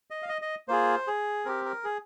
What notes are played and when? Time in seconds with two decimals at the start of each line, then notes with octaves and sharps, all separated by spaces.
0.10 D#5
0.23 F5
0.29 D#5
0.42 D#5
0.68 A#3 F4 G#4 C5
1.07 G#4
1.45 C4 G4 A#4
1.65 A#4
1.84 G#4